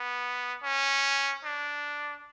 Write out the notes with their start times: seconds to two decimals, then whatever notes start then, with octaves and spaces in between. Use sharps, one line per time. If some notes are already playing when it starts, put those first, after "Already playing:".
Already playing: B3
0.63 C#4
1.44 D4